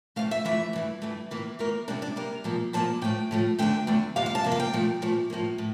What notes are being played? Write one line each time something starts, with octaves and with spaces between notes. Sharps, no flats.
F2 E3 A3 F5
E5
F2 E3 A3 E5
G2 E3 A3
G2 E3 A3
A2 E3 A#3
A2 E3 A#3 A#4
C3 G3 A#3 D4
D4
C3 G3 A#3 A#4
A#2 F3 A#3
A#2 F3 A#3 A5
A2 F3 A3 G5
A2 F3 A3
E2 D3 A3 G5
E2 D3 A3
F2 C3 G3 A#3 F5
F5
A5
F2 C3 A#3
F5
G5
A#2 F3 A3
A#2 F3 A3
A2 F3 A#3
A2